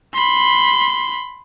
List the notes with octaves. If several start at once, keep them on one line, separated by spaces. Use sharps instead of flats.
B5 C6